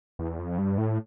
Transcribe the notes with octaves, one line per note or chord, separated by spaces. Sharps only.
E2
F2
G2
A2